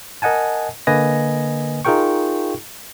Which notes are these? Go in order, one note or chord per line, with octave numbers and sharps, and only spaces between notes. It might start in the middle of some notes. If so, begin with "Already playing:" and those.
A#4 D#5 F#5 G#5 A5
D3 A#3 B4 D#5 G#5 A#6
D#4 F4 G#4 A#4 G5 C#6